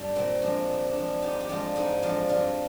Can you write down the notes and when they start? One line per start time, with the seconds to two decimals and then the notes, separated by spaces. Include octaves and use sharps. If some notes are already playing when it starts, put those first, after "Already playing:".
Already playing: G2 G3 D4 G4
0.15 A#2 C4
0.42 F3 G#3 D4
0.69 A#2
0.87 D4
0.96 F3 G#3
1.22 G#2 D#4 G4
1.40 G4
1.48 F3 G#3 D4 F4
1.76 G#2 C4 D#4
2.02 F3 G#3 D4 F4
2.29 G2 D4 F4